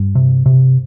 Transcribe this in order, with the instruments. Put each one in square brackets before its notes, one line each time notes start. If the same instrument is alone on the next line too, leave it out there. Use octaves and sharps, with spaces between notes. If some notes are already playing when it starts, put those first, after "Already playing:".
Already playing: [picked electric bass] G2 G3
C3
C3